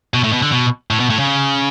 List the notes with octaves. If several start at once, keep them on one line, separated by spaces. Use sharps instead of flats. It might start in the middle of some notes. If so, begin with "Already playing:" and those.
B2
A2
B2
D3
B2
A2
B2
A2
C#3